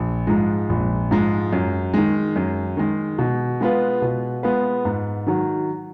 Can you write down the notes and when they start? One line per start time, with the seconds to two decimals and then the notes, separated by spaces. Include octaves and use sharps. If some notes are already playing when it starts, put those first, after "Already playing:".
Already playing: A#1
0.27 G#2 F3 G#3
0.69 A#1
1.11 G#2 F3 G#3
1.53 F#2
1.94 D#3 G#3
2.36 F#2
2.77 D#3 G#3
3.18 B2
3.61 G#3 B3 F4 B4
4.02 B2
4.43 G#3 B3 F4 B4
4.85 G#2
5.27 D#3 F#3